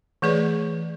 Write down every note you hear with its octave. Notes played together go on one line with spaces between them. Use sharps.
E3 A3 G#4 B4 D5